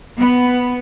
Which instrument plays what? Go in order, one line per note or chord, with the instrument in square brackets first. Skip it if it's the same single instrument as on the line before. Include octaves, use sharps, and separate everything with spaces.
[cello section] B3